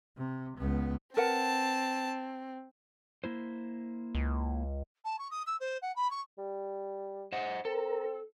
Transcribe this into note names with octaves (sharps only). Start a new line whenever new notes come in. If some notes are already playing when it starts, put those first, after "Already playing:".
C3
C#2 B3
C4 A#4 B4 F#5 A5
A#3 E4 C5
C#2
A5
C#6
D#6
E6
C5
F#5
B5
C#6
G3
C5 D#5 F#5
C4 A4 A#4